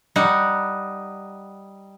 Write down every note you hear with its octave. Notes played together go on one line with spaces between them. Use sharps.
G3 D#4 F#5